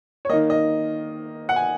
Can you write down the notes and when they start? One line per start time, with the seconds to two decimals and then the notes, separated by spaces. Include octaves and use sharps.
0.25 C#5
0.29 A#3 D#5
0.33 D#3
0.50 D#5
1.49 F#5
1.56 G#5